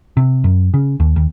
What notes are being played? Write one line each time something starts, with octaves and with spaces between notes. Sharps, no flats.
C3
F#2
C#3
D#2
D#2